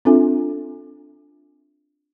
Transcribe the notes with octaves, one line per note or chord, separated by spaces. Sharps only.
C4 D4 F4 A4 E5 G#5